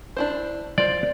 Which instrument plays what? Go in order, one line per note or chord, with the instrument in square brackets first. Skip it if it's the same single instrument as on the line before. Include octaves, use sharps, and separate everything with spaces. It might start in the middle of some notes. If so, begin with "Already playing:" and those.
[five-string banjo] D4 E4 C5
[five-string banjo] F4 C5 [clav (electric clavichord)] D5